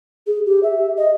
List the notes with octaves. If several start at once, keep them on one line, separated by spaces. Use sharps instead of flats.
G#4
G4
E5
D#5